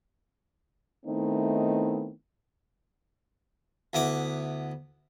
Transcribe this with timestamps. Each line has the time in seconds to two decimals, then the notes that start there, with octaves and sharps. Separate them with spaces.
1.05 D#3 A3 B3 C4 D#4 E4
3.93 D2 B3 E4 D6